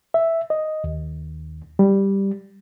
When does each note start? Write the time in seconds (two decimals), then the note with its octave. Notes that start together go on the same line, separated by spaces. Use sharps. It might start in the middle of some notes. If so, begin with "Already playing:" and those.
0.14 E5
0.50 D#5
0.84 D#2
1.79 G3